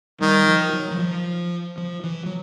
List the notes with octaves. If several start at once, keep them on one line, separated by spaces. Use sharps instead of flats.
D#3 G3
F3
F#3
E3
F3
F3
E3
F#3